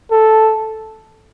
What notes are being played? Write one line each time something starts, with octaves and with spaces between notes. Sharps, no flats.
A4